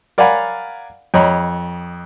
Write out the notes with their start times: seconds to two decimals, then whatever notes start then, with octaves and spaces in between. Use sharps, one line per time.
0.18 A#4 D5 F5 F#5 G#5 B5
1.14 F2 C#5 D#5 A#5 B5